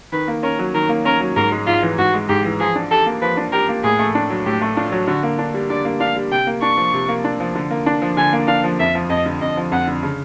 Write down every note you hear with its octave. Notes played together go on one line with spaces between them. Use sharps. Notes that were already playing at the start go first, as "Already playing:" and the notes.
D#3 B4
A#3
C#4 A#4
F#3
D#3 A#4
A#3
C#4 A#4
F#3
G#2 A#4
G#3
G#2 F4
E3
G#2 F#4
G#3
G#2 G4
E3
F3 G#4
D4
G4 A4
A#3
F3 B4
D4
G4 A#4
A#3
A2 G#4
A3
D4
F#3
A2 G4
A3
D4 F4
F#3
D3 F#4
A#3
D4
G3
D3 D5
A#3
D4 F5
G3
C3 G5
A#3
D4 C#6
F3
C3
A#3
D4
F3
D3
A#3
D4
F3
D3 G#5
A#3
D4 F5
F3
F2 E5
F3
F2 D#5
D3
F2 D#5
F3
F2 F#5
D3
C#3